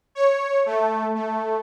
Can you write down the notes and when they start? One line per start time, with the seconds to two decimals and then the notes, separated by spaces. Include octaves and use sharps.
0.15 C#5
0.66 A3
1.15 A3